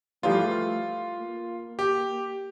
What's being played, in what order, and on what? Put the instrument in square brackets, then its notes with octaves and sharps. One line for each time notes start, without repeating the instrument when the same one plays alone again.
[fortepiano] E3 F3 G3 [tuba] A3 [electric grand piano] F4
[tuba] A#3
[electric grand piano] G4